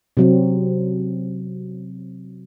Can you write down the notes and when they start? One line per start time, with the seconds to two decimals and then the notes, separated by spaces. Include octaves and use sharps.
0.17 C3 F#3 C4